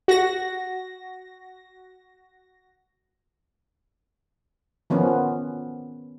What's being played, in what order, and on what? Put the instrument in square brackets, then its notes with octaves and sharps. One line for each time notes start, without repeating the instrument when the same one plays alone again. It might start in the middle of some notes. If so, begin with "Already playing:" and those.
[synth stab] F#4 A#6
[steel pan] D#3 F3 B3 C#4